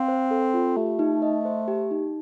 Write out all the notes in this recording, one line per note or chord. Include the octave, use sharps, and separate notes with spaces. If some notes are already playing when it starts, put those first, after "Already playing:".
Already playing: C4 F5
C5
A4
F4
A3 G4
D#4
D#5
C5
G4
D#4